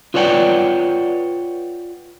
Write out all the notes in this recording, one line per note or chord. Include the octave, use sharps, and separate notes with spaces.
F4 B4 C#5 D5 F#5 G5